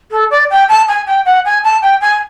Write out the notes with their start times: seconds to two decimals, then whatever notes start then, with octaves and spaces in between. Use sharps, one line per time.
0.11 A4
0.31 D5
0.50 G5
0.69 A5
0.88 G#5
1.07 G5
1.25 F#5
1.45 G#5
1.64 A5
1.82 G5
2.01 G#5